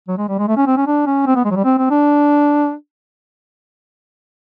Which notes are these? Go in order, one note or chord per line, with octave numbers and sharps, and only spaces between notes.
F#3
G#3
G3
G#3
A3
C#4
C4
C#4
D4
C#4
C4
B3
G#3
F#3
G3
C4
C4
D4